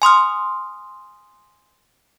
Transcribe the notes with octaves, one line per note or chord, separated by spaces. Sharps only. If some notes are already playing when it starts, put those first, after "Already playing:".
G#5 C6 D#6 F6